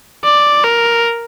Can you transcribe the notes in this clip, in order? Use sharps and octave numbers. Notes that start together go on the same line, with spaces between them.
D5
A#4